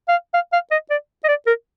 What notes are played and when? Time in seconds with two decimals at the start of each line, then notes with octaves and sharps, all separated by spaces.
0.08 F5
0.34 F5
0.53 F5
0.71 D#5
0.90 D5
1.24 D#5
1.28 D5
1.47 A#4